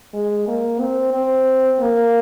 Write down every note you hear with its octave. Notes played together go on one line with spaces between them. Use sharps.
G#3
A#3
C4
C4
A#3